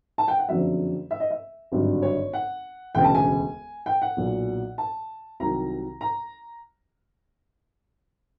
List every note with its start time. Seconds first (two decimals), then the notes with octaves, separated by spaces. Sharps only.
0.18 A5
0.28 G5
0.39 F#5
0.49 F#1 F2 D3 F#3 E5
1.11 E5
1.20 D#5
1.31 E5
1.72 G#1 G2 D3 F#3
2.02 C#5
2.33 F#5
2.95 E1 D2 C#3 G5
3.04 A5
3.15 G#5
3.86 G5
4.02 F#5
4.17 B1 A#2 F#3
4.78 A5
5.40 C2 C3 D#3 F#3 A#5
6.01 A#5